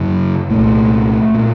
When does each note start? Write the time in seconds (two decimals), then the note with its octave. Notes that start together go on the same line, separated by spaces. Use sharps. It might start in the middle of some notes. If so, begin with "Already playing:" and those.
Already playing: F#2 C#3
0.50 C2 A#2 A3
1.34 A#2